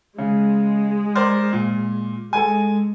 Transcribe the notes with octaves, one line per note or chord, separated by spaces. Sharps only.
C#3 G#3
A#4 C5 D5
A#2
G#3 A4 G#5